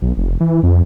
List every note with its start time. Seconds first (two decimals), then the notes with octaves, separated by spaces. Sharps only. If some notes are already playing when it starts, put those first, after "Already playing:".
0.02 B1
0.17 F1
0.40 E3
0.63 F2